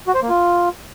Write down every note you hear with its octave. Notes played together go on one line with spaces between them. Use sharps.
F#4
C5
A#3
F4